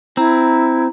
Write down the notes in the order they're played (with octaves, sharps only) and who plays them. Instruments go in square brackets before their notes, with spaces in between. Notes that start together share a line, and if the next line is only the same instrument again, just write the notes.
[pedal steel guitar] C4 [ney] E4 [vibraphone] A#5